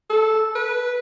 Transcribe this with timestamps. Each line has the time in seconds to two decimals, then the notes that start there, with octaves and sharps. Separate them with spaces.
0.10 A4
0.55 B4